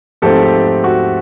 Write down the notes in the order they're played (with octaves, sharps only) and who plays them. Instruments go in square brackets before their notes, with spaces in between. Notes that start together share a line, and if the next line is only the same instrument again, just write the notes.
[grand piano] G#2 F3 A3 C4 G4 A4
G4
F#4